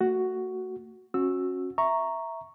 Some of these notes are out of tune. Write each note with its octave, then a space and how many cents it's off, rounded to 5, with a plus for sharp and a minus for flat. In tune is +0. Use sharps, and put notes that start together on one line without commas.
A3 +35 F#4 +5
C#4 -30 F#4 -20 E6 +0
E5 +0 A#5 +0 C#6 +0